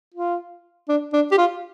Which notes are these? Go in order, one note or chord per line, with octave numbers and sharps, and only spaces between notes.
F4
D4
D4
G4
F4